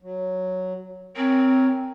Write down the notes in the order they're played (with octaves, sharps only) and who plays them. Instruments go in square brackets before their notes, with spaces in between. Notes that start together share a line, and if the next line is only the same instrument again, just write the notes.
[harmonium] F#3
[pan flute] C4 [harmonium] A#4 C#5 G#5